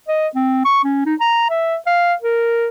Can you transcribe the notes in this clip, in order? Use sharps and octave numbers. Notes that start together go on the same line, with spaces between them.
D#5
C4
C#6
C#4
D#4
A#5
E5
F5
A#4